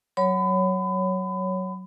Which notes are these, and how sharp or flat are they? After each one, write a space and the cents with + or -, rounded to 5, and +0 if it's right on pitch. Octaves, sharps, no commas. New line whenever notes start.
F#3 +10 C#5 +0 B5 +30